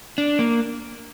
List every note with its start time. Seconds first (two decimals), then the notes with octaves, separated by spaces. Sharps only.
0.18 D4
0.39 A#3